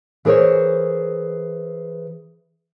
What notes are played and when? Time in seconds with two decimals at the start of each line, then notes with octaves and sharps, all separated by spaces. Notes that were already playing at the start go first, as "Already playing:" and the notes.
0.25 E3 G#4 A#4 C5 C#5